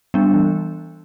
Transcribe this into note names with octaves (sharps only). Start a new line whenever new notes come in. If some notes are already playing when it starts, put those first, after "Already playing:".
G3 B3 D4
E3